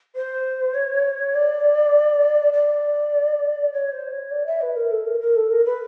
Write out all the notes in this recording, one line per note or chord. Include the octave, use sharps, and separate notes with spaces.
C5
C#5
D5
D5
C#5
C5
C#5
D5
E5
B4
A#4
A4
A#4
A#4
A4
A#4
B4